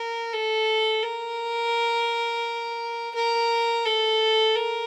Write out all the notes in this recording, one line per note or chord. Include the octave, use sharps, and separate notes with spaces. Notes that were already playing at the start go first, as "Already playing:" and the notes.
Already playing: A#4
A4
A#4
A#4
A4
A#4